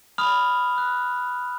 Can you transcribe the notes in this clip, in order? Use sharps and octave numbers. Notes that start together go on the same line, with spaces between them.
B5 D#6 F6 F7
D#6 F#6